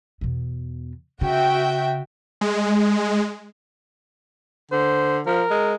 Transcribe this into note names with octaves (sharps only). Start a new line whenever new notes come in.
E2 B2
C#3 F#4 E5 G5
G#3
D3 C5
F3 A#4
G#3